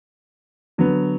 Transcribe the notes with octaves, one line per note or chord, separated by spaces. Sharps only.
D3 F#3 B3